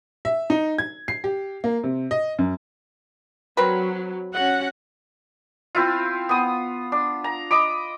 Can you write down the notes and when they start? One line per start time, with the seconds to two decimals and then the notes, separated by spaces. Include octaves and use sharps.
0.25 E5
0.50 D#4
0.78 G#6
1.08 C7
1.24 G4
1.64 A#3
1.84 C3
2.11 D#5
2.39 F#2
3.57 F#3 C4 A#4 B4
4.34 C#4 F#4 F#5
5.75 C4 E4 F4
6.29 B3 D#6
6.92 D4
7.24 A#5
7.51 D#5 B5 D6